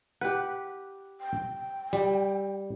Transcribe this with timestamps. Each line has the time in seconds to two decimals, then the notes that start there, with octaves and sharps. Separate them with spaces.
0.21 G4 B4 F#5
1.21 G5
1.93 G3